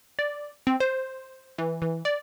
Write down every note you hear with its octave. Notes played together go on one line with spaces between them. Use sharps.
D5
C4
C5
E3
E3
D5